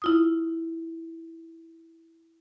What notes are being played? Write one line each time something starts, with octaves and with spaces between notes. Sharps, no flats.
E4 F4 D#6